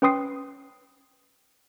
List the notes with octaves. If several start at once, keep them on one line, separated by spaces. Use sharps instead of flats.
C#4 B4 G5 C6 D#6 C7